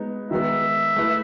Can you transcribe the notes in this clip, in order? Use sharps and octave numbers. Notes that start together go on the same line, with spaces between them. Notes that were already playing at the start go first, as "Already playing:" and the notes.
Already playing: G#3 B3 D#4
D#3 G#3 B3 E5
A3 E4 B4